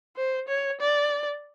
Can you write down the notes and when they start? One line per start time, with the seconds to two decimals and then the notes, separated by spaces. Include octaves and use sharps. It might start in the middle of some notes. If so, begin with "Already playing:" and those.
0.16 C5
0.48 C#5
0.80 D5